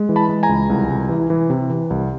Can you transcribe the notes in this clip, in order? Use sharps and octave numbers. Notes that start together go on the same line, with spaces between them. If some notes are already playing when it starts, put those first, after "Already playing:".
Already playing: G#3
E3
A5 B5
G#3
G#5 A#5
C#2
C2
C2
E3
E3
C3
E3
C2